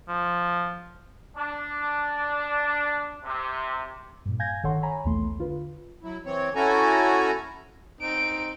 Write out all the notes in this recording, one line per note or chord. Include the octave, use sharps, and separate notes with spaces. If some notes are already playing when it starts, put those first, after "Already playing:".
F3
D4
C3
G2 A#2
F5 G#5 G6 G#6 A#6
G1 D#3 A4 C#5 F#5 C6
C#5 G#5 A#5 B5
B1 E2 E3 A3 C6
D3 F4 B4
F#3 E4
E3 C4 C#5
C#4 E4 F#4 A4 G#5 A#5
C4 D#4 D7